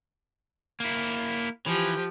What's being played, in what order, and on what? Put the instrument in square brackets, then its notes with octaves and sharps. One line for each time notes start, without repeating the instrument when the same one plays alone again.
[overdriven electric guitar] A#3 E4
[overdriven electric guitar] E3 [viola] F3 G4